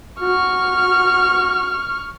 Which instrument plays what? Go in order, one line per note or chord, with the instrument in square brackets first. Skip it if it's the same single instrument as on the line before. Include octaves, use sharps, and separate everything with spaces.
[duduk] F#4 [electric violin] C#6 F6